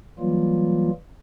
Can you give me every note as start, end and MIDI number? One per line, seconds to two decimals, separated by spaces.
0.19 0.90 52
0.19 0.90 54
0.19 0.90 55
0.19 0.90 58
0.19 0.90 65